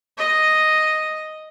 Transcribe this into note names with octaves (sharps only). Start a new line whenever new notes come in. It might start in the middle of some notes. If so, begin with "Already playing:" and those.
D#5